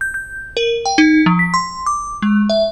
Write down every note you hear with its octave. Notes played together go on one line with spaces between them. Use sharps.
G6
G6
A#4
G5
D#4
F3
B6
C6
D6
G#3
E5